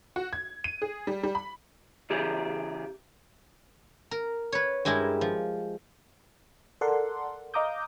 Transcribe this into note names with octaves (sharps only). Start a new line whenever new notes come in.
F#4
G#6
D#7
G#4
G3
G3
B5
C#3 E3 G4 G#4
A#4
B4 C#5
G2 G#3 E4 G4 A#4
F3
A4 A#4 D5 F#5 C6
D#5 F5 A#5 D6 D#6 G6